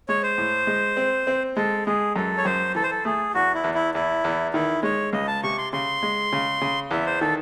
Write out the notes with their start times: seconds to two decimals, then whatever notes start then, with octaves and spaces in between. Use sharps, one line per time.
0.09 G#3 C#5
0.23 C5
0.38 A2
0.67 G#3
0.97 C4
1.27 C4
1.57 G#3 A4
1.86 G#3 G#4
2.16 F#2 A4
2.38 C#5
2.45 F#2 C5
2.75 E3 A4
2.83 C5
2.91 A4
3.05 A3 G#4
3.34 E2 F#4
3.55 E4
3.64 E2
3.74 E4
3.94 E2 E4
4.24 E2
4.54 D#3 E4
4.83 G#3 C#5
5.13 C#2 D#5
5.27 A5
5.43 C3 C#6
5.58 C6
5.73 C#3 C6
6.03 G#3
6.32 C#3
6.61 C#3
6.91 E2 E5
7.06 C5
7.21 D#3 A4